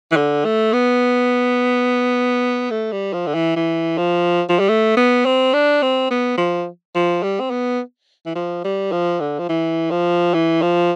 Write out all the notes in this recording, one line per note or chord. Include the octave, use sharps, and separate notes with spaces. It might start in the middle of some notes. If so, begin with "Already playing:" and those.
E3
D3
A3
B3
A3
G3
F3
D3
E3
E3
F3
F3
G3
A3
B3
C4
D4
C4
B3
F3
F3
G3
C4
B3
E3
F3
G3
F3
D3
F3
E3
F3
E3
F3